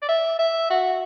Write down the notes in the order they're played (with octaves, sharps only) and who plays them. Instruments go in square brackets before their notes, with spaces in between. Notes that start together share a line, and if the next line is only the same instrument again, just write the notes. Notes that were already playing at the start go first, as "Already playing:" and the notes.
[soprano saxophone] D5
E5
E5
F#4